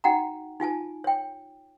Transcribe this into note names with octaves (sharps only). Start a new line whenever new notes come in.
D#4 F#4 F#5 G5 A#5
D#4 F4 G#5 A5
C#5 G5